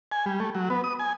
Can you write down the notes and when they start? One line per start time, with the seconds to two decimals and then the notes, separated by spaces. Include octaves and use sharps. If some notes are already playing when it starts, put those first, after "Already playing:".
0.12 G#5
0.26 G3
0.40 A3
0.55 F#3
0.70 B3
0.84 D#6
0.99 G#5